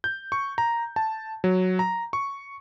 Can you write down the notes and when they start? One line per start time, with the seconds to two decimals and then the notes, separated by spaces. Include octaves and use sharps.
0.04 G6
0.32 C#6
0.58 A#5
0.96 A5
1.44 F#3
1.79 A#5
2.13 C#6